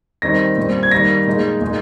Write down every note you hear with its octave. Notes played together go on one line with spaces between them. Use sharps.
D#3 G3 C4 D#4 A#6
A#2 G3 C4
G#6
D#3 G3 A#3 D#4 A#6
A#2 G#3 D#4
A#2 G#3 D#4